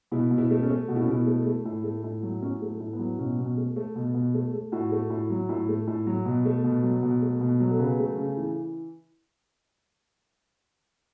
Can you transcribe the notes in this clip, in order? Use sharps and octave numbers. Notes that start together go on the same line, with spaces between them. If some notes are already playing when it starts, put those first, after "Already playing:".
B2 E4
B2
E4
A3
C#4
A3
B2 F#4
E4
C#4
B2 E4
A3
A3
A2
A3
A2
F#3
A2 C#4
A3
A2
B3
F#3
B2 C#4
B2
A3
A3
B2
B2
A3
A3
A2 F#4
A3
A2
F#3
A2
A3
A2
F#3
B2
A3
B2
F#3
B2
A3
B2
F#3
A4
C#3 B4
A3
C#3
E3